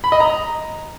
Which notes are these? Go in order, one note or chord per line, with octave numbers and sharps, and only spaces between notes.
B5
D#5
A#5